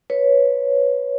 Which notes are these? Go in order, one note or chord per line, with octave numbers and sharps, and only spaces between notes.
B4 C#5